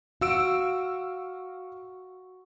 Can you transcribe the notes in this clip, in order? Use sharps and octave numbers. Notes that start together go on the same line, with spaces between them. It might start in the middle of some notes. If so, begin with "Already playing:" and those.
F#4 F5 E6 D7